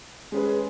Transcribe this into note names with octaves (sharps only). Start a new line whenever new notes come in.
G#3 C#4 G#4 B4